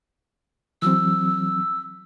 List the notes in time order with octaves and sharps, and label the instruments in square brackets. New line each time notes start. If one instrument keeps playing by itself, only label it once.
[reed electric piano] E3 F#3 C4 [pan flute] E6